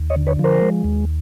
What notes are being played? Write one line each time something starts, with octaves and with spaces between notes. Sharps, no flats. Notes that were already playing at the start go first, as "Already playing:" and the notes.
Already playing: D#2
C#5 D#5
D3
B4 C#5
F3 A#4 C5
G#3
D#2